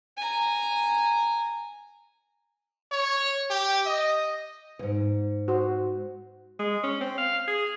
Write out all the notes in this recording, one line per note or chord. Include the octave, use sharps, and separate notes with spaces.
G#5 A#5
C#5
G4
D#5
E2 G#2
F#4 C5
G#3
C#4
C4
F5
G#4